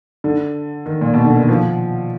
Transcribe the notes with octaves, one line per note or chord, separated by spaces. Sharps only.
D3
D#3
A#2
B2
D3
D#3
F3